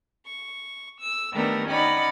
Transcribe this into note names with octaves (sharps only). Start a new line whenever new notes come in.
C#6
E6
D#3 G3 A3 B3 D4 A#4
C#4 D#4 D5 F#5 B5